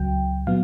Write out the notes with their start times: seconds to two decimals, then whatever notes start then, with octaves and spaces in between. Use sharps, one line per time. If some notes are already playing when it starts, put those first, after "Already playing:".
Already playing: C#2 C#3 F#3 G5
0.47 A#2 F#3 B3 F5